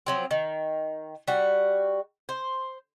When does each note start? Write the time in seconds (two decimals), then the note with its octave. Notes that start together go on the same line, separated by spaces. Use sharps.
0.06 F3 F#3 C4
0.31 D#3
1.28 G3 F#4
2.29 C5